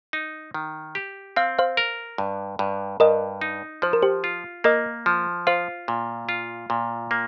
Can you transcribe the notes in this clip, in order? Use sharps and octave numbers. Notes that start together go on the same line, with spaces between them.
D#4
D#3
G4
C4 F5
C5 F5
A#4
G2
G2
G2 A#4 D#5
D#4
F3 C5
A#4
G4 C5
F4
A#3 A#4 D#5
F3
F4 C5 F5
A#2
F4
A#2
A#3